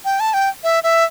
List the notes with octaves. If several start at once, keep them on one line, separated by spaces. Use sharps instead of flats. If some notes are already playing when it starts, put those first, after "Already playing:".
G5
A5
G5
E5
E5